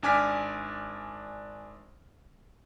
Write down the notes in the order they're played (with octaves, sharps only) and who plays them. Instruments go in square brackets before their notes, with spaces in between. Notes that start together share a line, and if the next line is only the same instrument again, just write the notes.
[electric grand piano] G#1 D4 G#5 D6 F6 B6